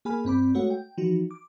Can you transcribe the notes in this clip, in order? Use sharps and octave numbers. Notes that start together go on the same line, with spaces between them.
A#3 G#4 G#5 B5 F6
G2 C4 B5 D6
G#3 A3 F#4 C#5 F#5
G5
E3 F3 D#4 F#4
D6